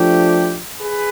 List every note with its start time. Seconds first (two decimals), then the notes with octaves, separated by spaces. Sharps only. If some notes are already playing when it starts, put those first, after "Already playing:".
Already playing: F3 A3 D4 G4
0.80 G#4 B4